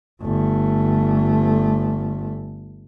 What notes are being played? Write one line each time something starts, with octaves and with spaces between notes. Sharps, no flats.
G1 A3